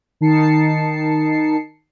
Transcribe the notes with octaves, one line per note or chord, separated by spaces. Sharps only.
D#3 D#4 A5 C7 C#7